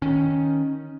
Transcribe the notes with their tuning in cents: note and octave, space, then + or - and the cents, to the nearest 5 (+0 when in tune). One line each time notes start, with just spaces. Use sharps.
D#3 +5 C#4 +0